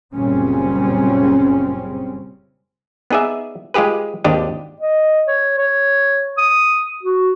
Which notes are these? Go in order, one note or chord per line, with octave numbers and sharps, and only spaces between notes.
F#1 A#2 C#3 G3 C4 C#4
B3 D#4 G#4 D5 E5
G#3 F4 G4 G#4 B4
G#1 D#2 D4 G4 D#5
D#5
C#5
C#5
D#6
F#4